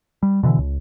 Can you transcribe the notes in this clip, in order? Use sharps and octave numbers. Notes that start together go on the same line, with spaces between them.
G3
B2 D3 E3
C#2